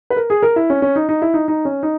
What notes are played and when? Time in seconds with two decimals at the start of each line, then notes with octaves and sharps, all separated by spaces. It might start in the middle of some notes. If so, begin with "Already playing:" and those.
0.10 B4
0.16 A#4
0.30 G#4
0.43 A#4
0.56 E4
0.70 C#4
0.82 C#4
0.96 D#4
1.09 D#4
1.22 E4
1.34 D#4
1.48 D#4
1.65 C#4
1.83 D#4